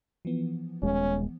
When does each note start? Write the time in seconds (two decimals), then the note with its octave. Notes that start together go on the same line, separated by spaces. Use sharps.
0.25 E3 F3 B3
0.83 D#1 G#3 C#4